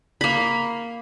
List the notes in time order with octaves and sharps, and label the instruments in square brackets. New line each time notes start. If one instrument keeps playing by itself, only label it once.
[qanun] A#3 B5